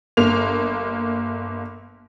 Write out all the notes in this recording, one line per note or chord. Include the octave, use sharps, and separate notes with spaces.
G1 A#3 F7